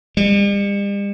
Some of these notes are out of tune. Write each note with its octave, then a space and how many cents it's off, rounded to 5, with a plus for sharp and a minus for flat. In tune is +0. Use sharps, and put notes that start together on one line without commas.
G3 +45